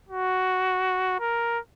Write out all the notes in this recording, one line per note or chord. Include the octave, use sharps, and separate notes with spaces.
F#4
A#4